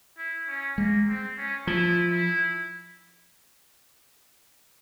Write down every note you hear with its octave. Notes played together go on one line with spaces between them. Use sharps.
E4
C#4
G#3 A#3
C4
C#4
F3 E4
E4